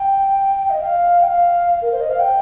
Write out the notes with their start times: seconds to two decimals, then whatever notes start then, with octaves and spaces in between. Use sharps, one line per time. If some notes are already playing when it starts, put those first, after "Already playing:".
Already playing: G5
0.70 D#5
0.81 F5
1.22 G5
1.28 F5
1.82 A#4
1.92 C5
2.01 D#5
2.10 F5
2.19 G5